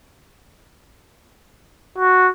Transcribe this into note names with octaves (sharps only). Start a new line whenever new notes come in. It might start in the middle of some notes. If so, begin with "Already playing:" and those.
F#4